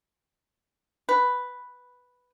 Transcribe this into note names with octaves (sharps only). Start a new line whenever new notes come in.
B4